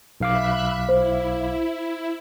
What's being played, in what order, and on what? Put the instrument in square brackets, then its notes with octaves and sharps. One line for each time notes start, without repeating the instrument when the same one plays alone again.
[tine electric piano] B1 F5 D6 [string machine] E5 B5 F#6
[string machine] E4 [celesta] C5